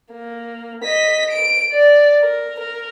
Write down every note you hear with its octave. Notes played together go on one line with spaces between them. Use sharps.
A#3
D#5 B6
D7
D5
A#4
A#4